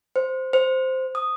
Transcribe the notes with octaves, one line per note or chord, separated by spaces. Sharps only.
C5
C5
D#6